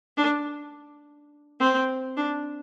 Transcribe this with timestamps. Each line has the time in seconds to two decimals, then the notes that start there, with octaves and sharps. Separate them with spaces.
0.17 D4
1.60 C4
2.17 D4